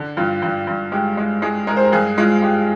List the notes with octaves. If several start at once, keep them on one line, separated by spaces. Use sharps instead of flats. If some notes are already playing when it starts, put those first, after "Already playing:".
Already playing: D3
G2 F4
G2
G2
G#3 G4
G#3
G#3 G#4
G#3 A#4
C5
A#4
G2 G#4
G#3 F4
G#3 G4